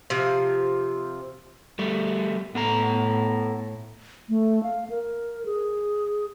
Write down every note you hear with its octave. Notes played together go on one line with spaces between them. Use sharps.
C3 F3
G3 A3
A2 B3 A4 A#5
A3
F5
A#4
G#4